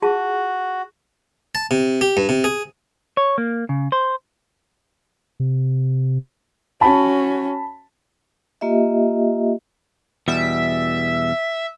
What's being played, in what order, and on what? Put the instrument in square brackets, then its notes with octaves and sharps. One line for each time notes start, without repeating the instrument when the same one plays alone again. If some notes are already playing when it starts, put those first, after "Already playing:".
[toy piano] F4 G#4 A5 [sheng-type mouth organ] F#4
[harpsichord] A5
C3
G4
G2
C3
G#4
[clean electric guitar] C#5
A#3
C#3
C5
[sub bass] C3
[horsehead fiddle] C#4 F#4 [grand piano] A5 B5
[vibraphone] A#3 F4 G4 D#5 E5
[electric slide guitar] E2 B2 G3 [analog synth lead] E5